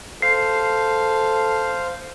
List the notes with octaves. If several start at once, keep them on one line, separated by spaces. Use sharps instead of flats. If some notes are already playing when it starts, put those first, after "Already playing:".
A4 C5 F5 C7